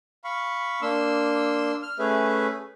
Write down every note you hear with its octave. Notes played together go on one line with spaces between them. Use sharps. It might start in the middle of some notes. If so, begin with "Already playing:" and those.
F5 B5 C#6
A#3 D4 C6 E6
F6
A3 C#4 G#4 B4 E5